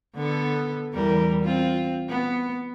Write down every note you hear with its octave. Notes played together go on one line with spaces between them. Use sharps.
D3 B3 A4
E2 G3 A#4
C4 F4
B3